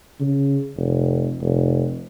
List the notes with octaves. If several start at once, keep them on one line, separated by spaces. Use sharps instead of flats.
C#3
F1
F1